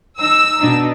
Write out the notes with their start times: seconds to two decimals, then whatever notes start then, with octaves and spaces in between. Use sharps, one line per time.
0.20 D#4 E6
0.59 B2 D4 D#4